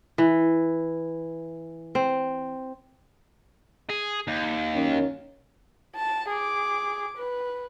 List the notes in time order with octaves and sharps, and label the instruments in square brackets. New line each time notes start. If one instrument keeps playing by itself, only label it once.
[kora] E3
C4
[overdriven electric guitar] G#4
D#2
[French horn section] F#2 D#3 C#4
[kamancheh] A5
G#4 D6
B4